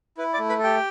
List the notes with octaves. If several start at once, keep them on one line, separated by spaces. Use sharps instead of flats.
E4 B4
D5 D6
A3
B4 B5
A4
G4 G5